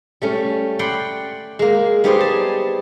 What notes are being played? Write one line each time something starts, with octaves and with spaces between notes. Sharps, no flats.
G3 A3 C#4
D5 F#5 G5 B5 C6
G#3 A#3
G3 B3 D#4 G4 G#4 C5
A5